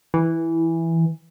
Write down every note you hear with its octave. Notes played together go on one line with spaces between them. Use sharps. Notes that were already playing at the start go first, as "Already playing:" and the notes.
E3